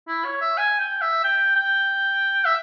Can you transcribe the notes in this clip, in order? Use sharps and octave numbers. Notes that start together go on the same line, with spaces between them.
E4
C#5
E5
G#5
G5
E5
G5
G5
E5